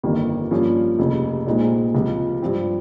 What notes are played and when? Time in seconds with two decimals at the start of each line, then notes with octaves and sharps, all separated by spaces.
0.04 G1 F2 D#3 G3 A#3
0.51 G2 F3 A#3 C#4
0.99 F1 D#2 C#3
1.47 A#1 A#2 G#3 C4 D#4
1.95 C#2 C3 F3
2.42 G2 F3 C4